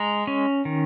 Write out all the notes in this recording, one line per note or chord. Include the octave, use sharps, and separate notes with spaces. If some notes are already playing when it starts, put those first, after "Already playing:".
Already playing: G#3 A#5
C#4
D#3